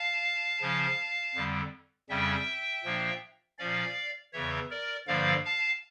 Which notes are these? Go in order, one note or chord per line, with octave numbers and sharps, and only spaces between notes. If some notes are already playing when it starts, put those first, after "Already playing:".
Already playing: F5 A5
C#3 F3 C#4
F2 D3 G3
F2 C#3 G3 C#4 E5 G5
A#2 F3 A#3 D4
A#2 F3 C#4 D5 F5
E2 C#3 E3 C#5 E5
A#4 D5
G2 D3 F3 A#3 D5 F5
F5 A5